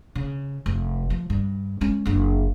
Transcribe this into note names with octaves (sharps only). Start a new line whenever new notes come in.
C#3
F1
F3
G2
G#3 C#4
F#1 D4